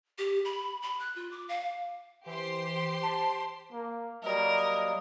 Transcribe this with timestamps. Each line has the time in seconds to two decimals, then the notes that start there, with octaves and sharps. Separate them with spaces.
0.18 G4
0.45 B5
0.82 B5
1.00 F#6
1.16 F4
1.31 D6
1.49 F5
2.26 E3 G4 C5 C6
3.03 A5
3.72 A#3
4.24 F#3 G3 A#3 A#4 D#5